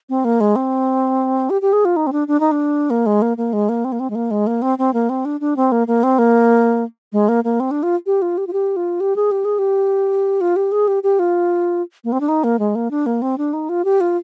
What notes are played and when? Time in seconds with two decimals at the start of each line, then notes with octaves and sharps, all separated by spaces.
0.09 C4
0.25 A#3
0.41 G#3
0.56 C4
1.50 G4
1.62 G4
1.73 G#4
1.85 F4
1.96 D#4
2.07 C4
2.12 D4
2.28 D4
2.40 D#4
2.52 D4
2.90 A#3
3.06 G#3
3.22 A#3
3.37 A#3
3.53 G#3
3.69 A#3
3.85 C4
3.92 A#3
4.00 C4
4.10 G#3
4.15 A#3
4.31 G#3
4.47 A#3
4.62 C4
4.78 C4
4.93 A#3
5.09 C4
5.25 D4
5.41 D4
5.56 C4
5.72 A#3
5.87 A#3
6.03 C4
6.19 A#3
7.12 G#3
7.28 A#3
7.44 A#3
7.60 C4
7.71 D4
7.83 F4
8.06 G4
8.22 F4
8.38 G4
8.47 F4
8.53 G4
8.76 F4
9.00 G4
9.16 G#4
9.31 G4
9.45 G#4
9.59 G4
10.41 F4
10.56 G4
10.72 G#4
10.88 G4
11.03 G4
11.19 F4
12.04 A#3
12.12 C4
12.21 D4
12.28 D#4
12.44 A#3
12.59 G#3
12.75 A#3
12.91 D4
13.06 A#3
13.22 C4
13.38 D4
13.53 D#4
13.69 F4
13.85 G4
14.01 F4